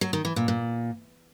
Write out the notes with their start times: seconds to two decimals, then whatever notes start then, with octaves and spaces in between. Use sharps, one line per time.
0.01 F#3
0.13 D#3
0.25 E3
0.36 A#2
0.48 A#2